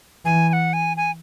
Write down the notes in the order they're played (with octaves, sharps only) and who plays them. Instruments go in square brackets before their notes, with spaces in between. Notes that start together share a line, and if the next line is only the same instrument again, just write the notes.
[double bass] E3 [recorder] G#5
[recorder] G#5
F#5
G#5
G#5